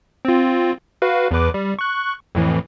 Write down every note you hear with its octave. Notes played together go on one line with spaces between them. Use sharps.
C4 F4
F#4 B4 F5
E2 B4 D6
G3
C#6 F#6
F2 A2 E3